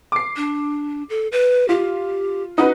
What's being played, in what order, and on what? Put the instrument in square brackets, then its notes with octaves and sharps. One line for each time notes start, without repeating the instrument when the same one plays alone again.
[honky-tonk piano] D6 C7
[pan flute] D4
A4
B4
[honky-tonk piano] F4 [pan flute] G4
[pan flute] C#4 [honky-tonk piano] D#4 F#4 B4